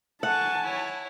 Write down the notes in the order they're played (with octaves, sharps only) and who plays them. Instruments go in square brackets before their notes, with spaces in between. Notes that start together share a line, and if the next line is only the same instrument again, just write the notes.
[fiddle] A4 C#6 [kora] F#5 [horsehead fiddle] G#5 A5
[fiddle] E4 C#5